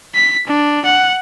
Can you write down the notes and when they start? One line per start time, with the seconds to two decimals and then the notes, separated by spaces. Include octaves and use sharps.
0.15 B6
0.47 D4
0.85 F#5